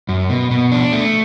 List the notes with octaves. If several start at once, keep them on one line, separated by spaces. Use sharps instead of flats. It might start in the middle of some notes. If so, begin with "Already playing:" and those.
F#2
B2
B2
D4
A3